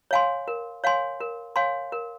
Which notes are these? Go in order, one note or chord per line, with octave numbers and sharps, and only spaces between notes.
C#5 F5 G#5 C6
A#4
C#5 F5 G#5 C6
A#4
C#5 F5 G#5 C6
A#4